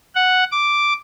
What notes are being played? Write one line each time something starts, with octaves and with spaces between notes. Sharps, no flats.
F#5
D6